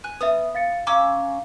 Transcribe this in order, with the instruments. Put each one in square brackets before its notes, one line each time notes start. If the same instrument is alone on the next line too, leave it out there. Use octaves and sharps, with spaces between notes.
[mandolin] G#5 F#6
[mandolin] B3 D#6 [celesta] B4 E5
[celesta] F5 A6 C#7
[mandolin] C#4 D6 E6 [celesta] F5 A#5